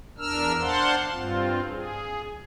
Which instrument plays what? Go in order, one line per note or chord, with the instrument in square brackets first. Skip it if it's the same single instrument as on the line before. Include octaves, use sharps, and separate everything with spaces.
[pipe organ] E2 D4 A#4 E6 F6
D4 C5 F5 F#5 A5 C6
G2 C4 F4
G#4